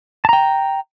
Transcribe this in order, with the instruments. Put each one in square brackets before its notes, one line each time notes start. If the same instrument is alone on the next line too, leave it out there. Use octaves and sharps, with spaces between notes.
[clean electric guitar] A5
A#5
G5